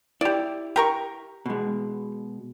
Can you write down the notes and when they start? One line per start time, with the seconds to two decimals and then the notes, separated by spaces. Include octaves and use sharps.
0.21 E4 G4 D5
0.76 G4 A#4 C#6
1.46 B2 G#3